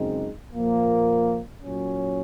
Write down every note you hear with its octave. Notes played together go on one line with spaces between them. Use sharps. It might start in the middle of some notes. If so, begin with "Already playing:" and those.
Already playing: F#2 C#3 G#3 C4 D#4
A#2 F3 A#3
A#2 F#3 C#4